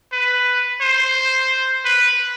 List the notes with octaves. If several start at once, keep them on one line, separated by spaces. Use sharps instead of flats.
B4
C5
B4